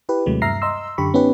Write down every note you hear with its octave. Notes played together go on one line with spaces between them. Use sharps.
E4 G4 B4
D#2 C3 F#3 G#3 A3
G2 E5 A#5 F6 A#6 C7
D#5 A#5 C6 E6
F#2 D3 G4 B5 C#6
B3 C#4 D#4 G4 B4